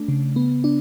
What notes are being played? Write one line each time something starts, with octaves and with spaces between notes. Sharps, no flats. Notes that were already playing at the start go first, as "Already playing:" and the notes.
Already playing: A3 D4
C#3
B3
D4